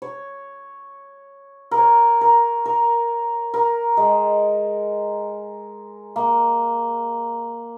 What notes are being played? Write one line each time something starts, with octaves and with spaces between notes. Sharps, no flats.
C#5
A#4
C#5
A#4
A#4
A#4
G#3
A#3